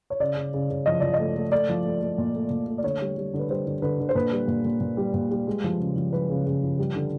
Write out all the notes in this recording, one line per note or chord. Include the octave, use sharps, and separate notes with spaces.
C#5
C#3 D5
C#3
C#3
C#3
F3 D#5
F3 D5
D#5
A3
A3
A3 D5
F3
A3
A3
A#2
A3
A#2
A3
D5
D3 C#5
G3
G3
D3
B4
G3 C5
D3
D3 B4
D3
C5
A#2 B4
G3
A#2
A#2
A#2
G3
A#2
G3
G#3
F3
C#3
F3
F3 B4
C#3
C#3
F3
G3
D3